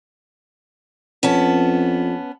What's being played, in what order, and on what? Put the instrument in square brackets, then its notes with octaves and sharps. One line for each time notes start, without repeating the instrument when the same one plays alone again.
[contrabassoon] F2 [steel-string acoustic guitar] B3 C#4 A5